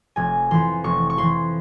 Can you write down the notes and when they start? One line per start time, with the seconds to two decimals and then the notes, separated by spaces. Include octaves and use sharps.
0.16 F1 G#5
0.51 F2 E3 C6
0.84 F1 C#6
1.10 C#6
1.18 F2 E3 C6